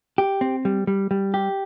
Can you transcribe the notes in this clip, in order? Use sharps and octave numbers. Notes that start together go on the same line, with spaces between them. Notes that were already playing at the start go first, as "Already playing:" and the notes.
G4
C4
G3
G3
G3
G4